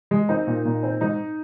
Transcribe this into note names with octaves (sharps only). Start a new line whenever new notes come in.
G#3
C4 D#4
A#2
A#2
C4
G#2 D#4